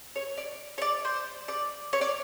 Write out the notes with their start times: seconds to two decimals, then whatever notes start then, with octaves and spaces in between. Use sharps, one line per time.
0.16 C#5
0.38 D5
0.78 C#5
0.82 D5
1.05 C5
1.48 D5
1.93 C#5
2.01 D5